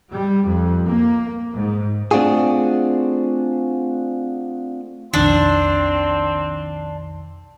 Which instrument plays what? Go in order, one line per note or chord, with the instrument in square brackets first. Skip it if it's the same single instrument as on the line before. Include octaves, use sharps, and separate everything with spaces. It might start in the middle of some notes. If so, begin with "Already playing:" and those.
[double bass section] G3
F2
A#3
G#2
[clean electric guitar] A3 C4 D4 F4 F#4 G#4
[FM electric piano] B1 F2 D#3 [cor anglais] C4 [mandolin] D4